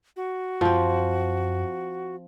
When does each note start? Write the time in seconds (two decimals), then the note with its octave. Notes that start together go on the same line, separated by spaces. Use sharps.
0.16 F#4
0.61 F#2 F3 C4